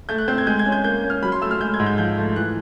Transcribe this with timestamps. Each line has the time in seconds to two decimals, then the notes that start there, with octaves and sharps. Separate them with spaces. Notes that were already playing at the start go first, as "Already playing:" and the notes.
0.09 A3 G6
0.18 F#6
0.28 C4 G6
0.38 G#6
0.47 G#3 G6
0.59 G#6
0.66 C#4
0.72 G6
0.84 A#3 G6
1.04 C#4
1.10 F6
1.23 F#3 B5
1.32 C6
1.41 A3 E6
1.51 F6
1.60 G#3 G6
1.74 G#6
1.80 G#2
1.86 G6
1.98 F3 G6
2.18 A3
2.36 E3 F#6